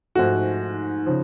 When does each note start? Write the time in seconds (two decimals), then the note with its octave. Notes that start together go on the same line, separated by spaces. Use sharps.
0.15 G#2 F3 A3 F#4
1.06 C#3 F3